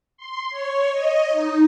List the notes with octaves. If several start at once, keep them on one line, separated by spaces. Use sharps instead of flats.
C6
C#5
D#5
D#4